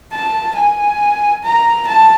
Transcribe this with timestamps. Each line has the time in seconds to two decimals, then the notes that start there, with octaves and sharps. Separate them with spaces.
0.12 A5
0.55 G#5
1.43 A#5
1.87 A5